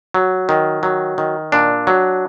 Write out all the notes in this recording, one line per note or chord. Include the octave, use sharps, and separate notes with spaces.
F#3
D#3
F#3
D#3
A#2 D4
F#3